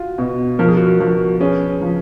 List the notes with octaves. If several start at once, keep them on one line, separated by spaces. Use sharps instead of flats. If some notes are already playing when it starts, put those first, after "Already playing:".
Already playing: F4 F#4
B2
F3 A#4
G#4
F#4 A#4
F3
C#4 G#4 B4
F3